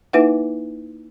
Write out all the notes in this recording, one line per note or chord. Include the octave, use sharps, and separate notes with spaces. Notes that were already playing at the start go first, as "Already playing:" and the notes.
A#3 D#4 E4 B4 E5 F#5